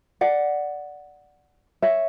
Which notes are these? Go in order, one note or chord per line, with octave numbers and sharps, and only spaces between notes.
D5 F#5
C#5 E5